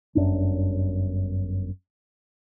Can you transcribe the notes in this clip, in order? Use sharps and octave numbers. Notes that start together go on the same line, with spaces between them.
G1 F#2 D4